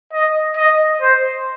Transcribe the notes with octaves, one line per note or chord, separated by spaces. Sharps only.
D#5
D#5
C5